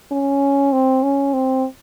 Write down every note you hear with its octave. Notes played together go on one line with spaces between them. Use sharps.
C#4
C4
C#4
C4